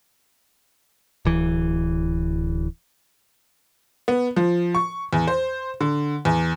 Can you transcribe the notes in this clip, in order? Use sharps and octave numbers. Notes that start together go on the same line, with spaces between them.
D1 E3
B3
F3
C#6
E2
C5
D3
E2